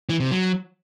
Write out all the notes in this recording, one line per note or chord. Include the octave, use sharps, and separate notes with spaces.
E3
C3
F#3